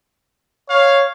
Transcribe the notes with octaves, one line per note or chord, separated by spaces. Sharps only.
C#5 F5